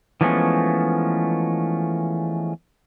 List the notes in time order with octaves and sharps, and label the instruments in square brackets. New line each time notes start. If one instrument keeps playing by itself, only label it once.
[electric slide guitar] E3 F3 G#3 A3 B3 C#4